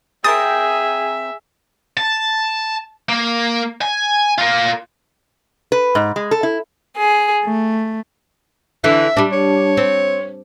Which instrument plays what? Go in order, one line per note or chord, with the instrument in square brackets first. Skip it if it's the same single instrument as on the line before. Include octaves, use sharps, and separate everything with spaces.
[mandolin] C4 A#4 G5 [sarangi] G#4 [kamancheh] E5 [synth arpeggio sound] D#6 A6
[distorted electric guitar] A5
A#3
G#5
F4 A#4
[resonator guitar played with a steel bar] B4
G#2
G#3
A4
E4
[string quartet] G#4
A3
[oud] D3 E3 [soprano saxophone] E5
[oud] G3 D4
[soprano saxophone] C#5
[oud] C4